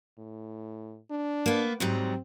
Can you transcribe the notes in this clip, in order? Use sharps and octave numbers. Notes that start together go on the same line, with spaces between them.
A2
D4
A#3 B3
G#2 F#3 G3 C4